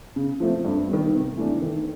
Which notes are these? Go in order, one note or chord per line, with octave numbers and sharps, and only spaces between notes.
C#3
F3 A3 C4
G2
D#3 G3
C3
E3 A3 D4
D#3